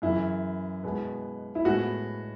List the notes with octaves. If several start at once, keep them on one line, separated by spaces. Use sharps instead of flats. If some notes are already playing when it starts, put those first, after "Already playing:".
F#2 C#3 E3 E4
B2 G#3 B3
E4
A2 G#3 B3 F#4